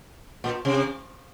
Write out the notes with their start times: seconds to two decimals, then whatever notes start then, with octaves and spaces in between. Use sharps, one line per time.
0.44 A#2
0.65 C3